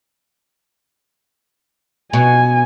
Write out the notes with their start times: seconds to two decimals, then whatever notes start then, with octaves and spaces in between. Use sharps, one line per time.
2.13 B2 G#5